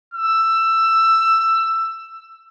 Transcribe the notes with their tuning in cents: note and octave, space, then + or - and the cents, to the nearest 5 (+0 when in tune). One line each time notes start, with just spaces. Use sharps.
E6 +15